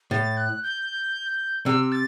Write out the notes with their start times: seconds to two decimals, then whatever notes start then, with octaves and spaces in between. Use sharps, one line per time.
0.11 A2 A6
0.37 F#6
0.63 G6
1.66 C3 E6
1.92 A6